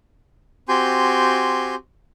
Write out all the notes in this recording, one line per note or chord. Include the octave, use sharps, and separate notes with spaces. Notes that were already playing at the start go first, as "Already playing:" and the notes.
C4 F#4 G4 G#5 C6 G6